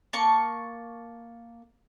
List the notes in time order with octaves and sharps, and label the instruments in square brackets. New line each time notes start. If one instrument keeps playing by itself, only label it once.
[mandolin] A#3 A5 C#6